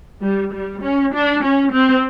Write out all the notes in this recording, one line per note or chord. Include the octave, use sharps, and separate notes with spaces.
G3
G3
C#4
D4
C#4
C4